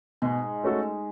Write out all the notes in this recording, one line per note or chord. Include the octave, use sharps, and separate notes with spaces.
G#2 B2 G#3
A3 C#4 F#4 A4